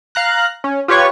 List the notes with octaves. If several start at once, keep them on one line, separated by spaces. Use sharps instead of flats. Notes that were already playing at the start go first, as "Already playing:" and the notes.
F5 A#5 F#6
C#4
F4 G4 B4 C#5 C#6